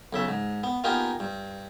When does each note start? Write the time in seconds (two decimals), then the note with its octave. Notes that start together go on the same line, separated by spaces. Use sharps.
0.13 B1 C#3 E5
0.28 G#2
0.63 B3
0.84 A#3 B3 D#4 F4 G4 G#4
1.20 G2